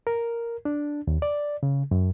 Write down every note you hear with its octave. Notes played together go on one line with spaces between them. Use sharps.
A#4
D4
D#2
D5
C#3
F#2